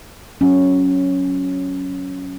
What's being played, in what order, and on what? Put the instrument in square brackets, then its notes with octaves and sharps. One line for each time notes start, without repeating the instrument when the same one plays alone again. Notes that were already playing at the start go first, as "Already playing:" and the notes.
[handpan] F#3 C#4